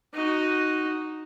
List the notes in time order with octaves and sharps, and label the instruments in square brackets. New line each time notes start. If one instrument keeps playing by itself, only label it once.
[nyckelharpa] D#4 F#4